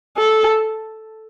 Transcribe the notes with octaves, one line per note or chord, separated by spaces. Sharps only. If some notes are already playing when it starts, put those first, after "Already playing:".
A4